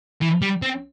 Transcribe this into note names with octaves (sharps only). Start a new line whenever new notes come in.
E3
G3
C4